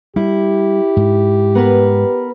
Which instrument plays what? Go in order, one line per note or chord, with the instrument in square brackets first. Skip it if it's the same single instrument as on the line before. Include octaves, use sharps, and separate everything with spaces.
[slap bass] G3 [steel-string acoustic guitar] E4 [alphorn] G4
[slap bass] G#2
[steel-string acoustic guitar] B3 A#4 B4